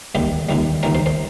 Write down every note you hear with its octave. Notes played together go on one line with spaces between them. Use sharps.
D#2 D#3 G3 G4
D#2 D#3 G3
D#2 D#3 G3 A#4
C5
C5